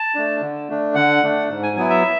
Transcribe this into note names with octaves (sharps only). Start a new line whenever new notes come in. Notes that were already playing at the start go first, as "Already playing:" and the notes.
Already playing: A5
A3 D4
D3
A3 D4
D3 F#5
A3 D4
G#2
G#5
F#3 B3 E4 G#5
E5